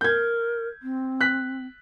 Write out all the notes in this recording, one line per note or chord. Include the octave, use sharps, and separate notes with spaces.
A#4 G6 G#6
C4
F#6 B6